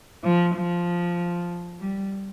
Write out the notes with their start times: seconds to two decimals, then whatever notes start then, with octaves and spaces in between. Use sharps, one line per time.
0.23 F3
0.55 F3
1.80 G3